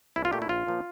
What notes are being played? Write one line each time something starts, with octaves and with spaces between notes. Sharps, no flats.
C2 E4
F4
A#2 A3 G4
E4
A#1 F4
A#2 F3 A#3